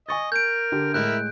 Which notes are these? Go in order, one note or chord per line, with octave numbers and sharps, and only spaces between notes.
D#5 G#5 C#6 A6
A#4 G6 D7
D3 G4
A2 G#3 E4 A#4 E5 F#6